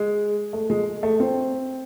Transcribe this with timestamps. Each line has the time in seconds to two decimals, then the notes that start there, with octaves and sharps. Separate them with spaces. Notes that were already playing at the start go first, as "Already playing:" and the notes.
Already playing: G#3
0.53 A3
0.70 G#3
1.03 A3
1.20 C4